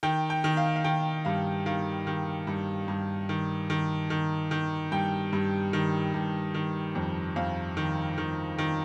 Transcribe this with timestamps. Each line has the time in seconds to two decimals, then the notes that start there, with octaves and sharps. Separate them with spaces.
0.03 D#3 G5
0.30 G5
0.44 D#3
0.57 F5
0.76 F5
0.84 D#3 G5
1.25 G2 F5
1.66 D#3 F5
2.07 D#3
2.47 G2
2.88 G2
3.29 D#3
3.70 D#3
4.10 D#3
4.51 D#3
4.92 G2 G5
5.33 G2
5.73 D#3
6.14 G2
6.54 D#3
6.95 F2
7.36 F2 F5
7.77 D#3
8.18 D#3
8.58 D#3